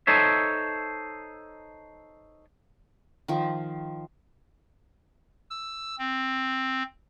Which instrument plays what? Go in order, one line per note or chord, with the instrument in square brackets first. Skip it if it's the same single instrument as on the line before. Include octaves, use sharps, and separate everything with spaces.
[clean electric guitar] D#4 A4 C5 C#5 E5
[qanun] D#3 F3
[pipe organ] E6
C4